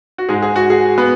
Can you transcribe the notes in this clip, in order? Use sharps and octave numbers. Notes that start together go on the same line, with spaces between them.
F#4
G#2 G#3 G#4
G#4
F#4
G#4
B3 B4